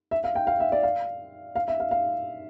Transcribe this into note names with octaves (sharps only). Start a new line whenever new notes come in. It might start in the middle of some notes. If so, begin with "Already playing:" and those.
E5
F5
G5
F5
E5
D5
F5
F5
E5
F5
F5